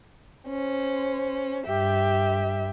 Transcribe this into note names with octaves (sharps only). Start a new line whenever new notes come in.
C#4 C5
G2 G4 E5